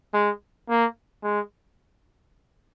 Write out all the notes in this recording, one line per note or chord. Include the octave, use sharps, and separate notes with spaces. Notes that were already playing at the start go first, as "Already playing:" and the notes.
G#3
A#3
G#3